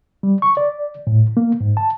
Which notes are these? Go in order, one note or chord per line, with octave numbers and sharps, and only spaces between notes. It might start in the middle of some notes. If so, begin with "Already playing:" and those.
G3
C#6
D5
A2
A#3
G#2
A5